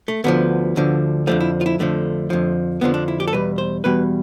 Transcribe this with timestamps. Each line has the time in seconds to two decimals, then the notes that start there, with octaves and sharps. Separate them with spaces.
0.08 A3
0.24 D2 D3 F3 B3
0.76 D2 D3 F3
1.27 F2 D3 F3 A3
1.40 E4
1.61 F4
1.66 E4
1.79 F2 D3 F3 A3
2.30 F2 D3 F3
2.81 F2 D3 F3 B3
2.94 D4
3.08 E4
3.20 G4
3.28 A4
3.33 E2 B2 G3 B4
3.58 C5
3.84 E2 B2 G3 B4